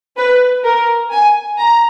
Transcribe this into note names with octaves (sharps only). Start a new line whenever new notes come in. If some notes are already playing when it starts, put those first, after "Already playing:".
B4
A#4
G#5
A#5